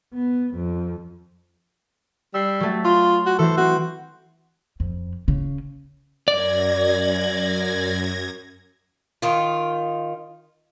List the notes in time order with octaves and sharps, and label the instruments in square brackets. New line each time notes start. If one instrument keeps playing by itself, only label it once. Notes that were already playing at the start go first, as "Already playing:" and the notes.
[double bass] B3
F2
[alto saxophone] G3 [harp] E6 C7
[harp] F#3 A3
[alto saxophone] F4 [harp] C6
[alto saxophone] F#4
[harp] E3 C5 [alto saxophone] A4
[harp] C4 [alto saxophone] F#4
[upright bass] F2
C#3
[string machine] F#2 G#6 A#6 [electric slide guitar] D5
[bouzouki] D#3 F4